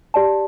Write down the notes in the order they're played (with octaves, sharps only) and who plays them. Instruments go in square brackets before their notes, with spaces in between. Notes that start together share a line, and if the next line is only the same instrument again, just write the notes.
[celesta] G4 D5 A5